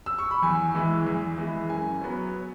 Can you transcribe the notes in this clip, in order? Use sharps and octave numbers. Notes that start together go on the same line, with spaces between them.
E6
C#6
B5
E2 G#5
E3 G#3 E4
E2
E3 G#3 E4
F#2 G#5
F#3 B3